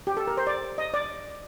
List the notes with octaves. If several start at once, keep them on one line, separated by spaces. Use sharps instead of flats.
G4
A4
A#4
C5
D5
D#5
D5